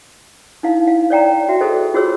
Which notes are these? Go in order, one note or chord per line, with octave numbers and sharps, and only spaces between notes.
D#4 E4 F5
F5
C#5 D5 G5 A#5
F#4 E5
G#4 A4 C5 D#5
F4 F#4 G#4 C5 C#5 E6